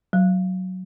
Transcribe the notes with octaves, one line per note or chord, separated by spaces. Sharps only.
F#3